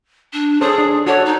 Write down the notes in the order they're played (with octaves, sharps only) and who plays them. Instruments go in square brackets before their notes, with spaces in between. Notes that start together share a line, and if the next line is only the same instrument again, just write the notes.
[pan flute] D4
[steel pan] C#4 A4 C5 [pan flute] G#4
[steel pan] D4
[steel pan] F#4 A4 D5 [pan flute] C#5
[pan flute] D#4